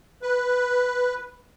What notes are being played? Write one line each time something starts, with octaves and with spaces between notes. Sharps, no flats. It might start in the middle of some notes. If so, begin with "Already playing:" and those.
B4